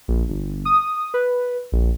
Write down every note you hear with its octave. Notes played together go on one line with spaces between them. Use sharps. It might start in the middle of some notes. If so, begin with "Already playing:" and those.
A#1
G1
D#6
B4
A#1